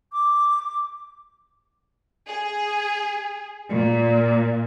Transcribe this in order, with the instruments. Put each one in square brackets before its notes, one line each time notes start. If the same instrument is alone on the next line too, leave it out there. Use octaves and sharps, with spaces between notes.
[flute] D6
[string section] G#4
A#2